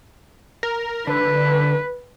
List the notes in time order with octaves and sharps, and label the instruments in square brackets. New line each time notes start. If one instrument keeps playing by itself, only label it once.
[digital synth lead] A#4
[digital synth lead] D3 [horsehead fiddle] B4